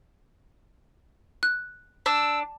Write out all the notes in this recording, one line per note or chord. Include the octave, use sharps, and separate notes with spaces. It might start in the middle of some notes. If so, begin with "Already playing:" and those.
F#6
D4 E6